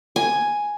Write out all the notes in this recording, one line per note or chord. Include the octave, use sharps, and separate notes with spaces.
G#5